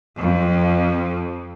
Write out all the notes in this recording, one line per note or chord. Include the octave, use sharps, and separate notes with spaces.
F2